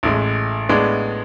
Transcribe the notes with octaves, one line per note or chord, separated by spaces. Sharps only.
A1 A2 G#3
A2 G#3 B3 D4